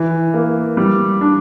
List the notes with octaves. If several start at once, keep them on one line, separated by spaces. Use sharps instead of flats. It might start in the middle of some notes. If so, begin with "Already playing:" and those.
Already playing: E3
A#3
G3
D4